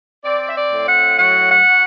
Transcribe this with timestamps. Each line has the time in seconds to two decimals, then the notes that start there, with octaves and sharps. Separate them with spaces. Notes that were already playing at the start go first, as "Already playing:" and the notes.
0.24 C4 D5
0.49 E5
0.55 D5
0.71 A2
0.87 F#5
1.18 F#3 F#5
1.50 F#5
1.65 F#3